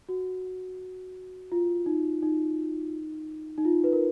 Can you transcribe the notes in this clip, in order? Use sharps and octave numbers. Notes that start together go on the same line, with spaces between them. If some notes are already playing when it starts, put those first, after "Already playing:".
F#4
F4
D#4
D#4
D#4
F4
B4
A#4